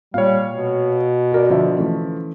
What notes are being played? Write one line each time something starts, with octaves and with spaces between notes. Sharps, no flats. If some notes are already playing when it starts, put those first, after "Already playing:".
A#2 G3 C#5 F5
B2
F#4 A#4 D5
D3 F3 E5
E3 A3 C#4